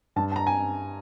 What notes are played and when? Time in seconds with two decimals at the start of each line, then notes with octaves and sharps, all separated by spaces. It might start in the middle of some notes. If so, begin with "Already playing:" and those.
0.16 G2 A5
0.32 A5
0.36 A#5
0.47 G#5